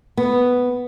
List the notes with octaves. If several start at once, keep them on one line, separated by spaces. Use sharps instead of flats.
B3